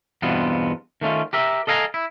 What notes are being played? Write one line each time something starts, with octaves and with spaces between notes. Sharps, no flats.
E2 G2 B2 B3 C4 F4
D#3 A3 C#4 F4
G4 A#4 E5
A4 D#5 F5 G#5 A#5
E4